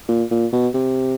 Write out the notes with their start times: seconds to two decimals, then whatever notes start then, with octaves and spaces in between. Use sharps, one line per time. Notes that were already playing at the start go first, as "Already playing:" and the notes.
0.09 A#2
0.31 A#2
0.53 B2
0.74 C3